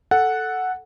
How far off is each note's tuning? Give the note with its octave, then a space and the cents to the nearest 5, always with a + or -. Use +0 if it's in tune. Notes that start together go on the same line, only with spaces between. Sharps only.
A4 +0 F#5 +0